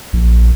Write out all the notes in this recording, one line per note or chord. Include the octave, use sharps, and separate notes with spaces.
A#1